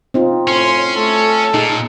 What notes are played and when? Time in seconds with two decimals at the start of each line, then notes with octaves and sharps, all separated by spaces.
0.14 C4 D#4 F4
0.48 A2 C#4 C6
0.96 A3 A4
1.54 A#2 D#4 G#4